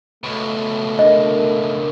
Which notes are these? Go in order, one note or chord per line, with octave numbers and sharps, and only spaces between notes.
C#2 B2 A3
D4 A#4 D#5